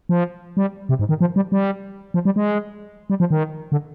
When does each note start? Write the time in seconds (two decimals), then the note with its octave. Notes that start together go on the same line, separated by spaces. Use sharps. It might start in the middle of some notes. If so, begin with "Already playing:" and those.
0.09 F3
0.57 G3
0.89 C3
0.99 G#2
1.09 D#3
1.21 F3
1.36 G3
1.52 G3
2.14 F3
2.25 G3
2.36 G#3
3.10 G3
3.20 F3
3.31 D#3
3.72 D3